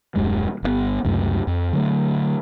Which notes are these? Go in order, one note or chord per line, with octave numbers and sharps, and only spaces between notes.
D#1 F#2 G#3
G1 D#3 B3
C#2 F#2 C3 A3
F2
D3 F#3 G3 A3